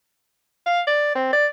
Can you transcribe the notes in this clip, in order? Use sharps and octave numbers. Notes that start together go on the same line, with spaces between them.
F5
D5
C4
D5